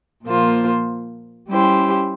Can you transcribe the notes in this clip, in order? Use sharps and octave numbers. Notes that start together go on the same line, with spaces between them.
A#2 F3 A#3 F4 C5
G3 C#4 E4 G4 C5